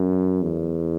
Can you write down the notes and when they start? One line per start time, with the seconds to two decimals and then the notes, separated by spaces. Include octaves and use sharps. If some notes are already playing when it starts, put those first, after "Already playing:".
Already playing: F#2
0.42 E2